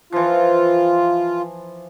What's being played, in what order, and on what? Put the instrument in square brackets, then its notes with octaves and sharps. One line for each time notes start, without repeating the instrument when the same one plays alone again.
[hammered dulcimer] E3 F3 [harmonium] F4